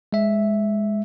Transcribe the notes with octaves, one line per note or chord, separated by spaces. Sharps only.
G#3 E5